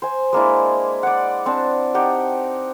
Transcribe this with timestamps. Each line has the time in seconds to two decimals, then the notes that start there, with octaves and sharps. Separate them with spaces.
0.02 C5 G#5
0.33 G#3 A#3 D4 E4
1.03 D5 F#5
1.46 C4 D4 A5
1.94 D#4 G4 F#5 G5